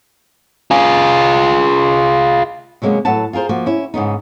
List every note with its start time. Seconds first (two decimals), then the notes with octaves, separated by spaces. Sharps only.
0.71 F4 G#4
2.82 C3 F#3 G#3 A#3 B3 C#4
3.05 A2 F#3 B4 F#5 A5
3.33 F4 G#4 A#4 C5
3.49 F3 A#3 F#4
3.66 C#4 E4
3.94 G#2 C#3 B3 D#4